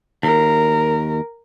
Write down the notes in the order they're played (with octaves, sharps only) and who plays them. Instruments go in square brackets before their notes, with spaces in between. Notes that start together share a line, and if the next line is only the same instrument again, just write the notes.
[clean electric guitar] D#2 [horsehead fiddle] A#4